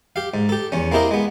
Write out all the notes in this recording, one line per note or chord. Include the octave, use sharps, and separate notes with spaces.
G4 F5
G#2
G4 A4
E2 C#4
A#3 C4 E4 G4 A#4 D#5
G#3 B3